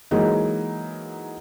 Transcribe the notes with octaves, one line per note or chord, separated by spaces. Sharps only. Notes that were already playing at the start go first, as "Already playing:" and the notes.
E3 F#3 G#3 A#3 D#4